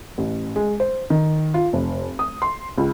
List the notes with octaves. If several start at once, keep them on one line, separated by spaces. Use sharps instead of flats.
A1
G#3
C5
D#3
F4
F1
D#6
C6
C#2